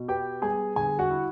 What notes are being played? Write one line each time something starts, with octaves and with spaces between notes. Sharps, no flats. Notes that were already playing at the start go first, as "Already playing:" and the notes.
Already playing: B2
B3 G4 G5
G3 G#4 G#5
D3 G#4 G#5
F#4 F#5
E4